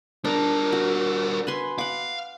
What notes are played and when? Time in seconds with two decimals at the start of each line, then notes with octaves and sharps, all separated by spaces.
0.25 G3 D4 A#4
0.73 F#4
1.47 B4 G#5 C6
1.79 F5 F#5 D6